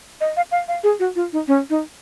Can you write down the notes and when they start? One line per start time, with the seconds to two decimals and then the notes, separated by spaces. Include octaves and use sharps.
0.21 D#5
0.37 F5
0.52 F5
0.68 F5
0.84 G#4
1.00 F#4
1.16 F4
1.33 D#4
1.48 C#4
1.70 D#4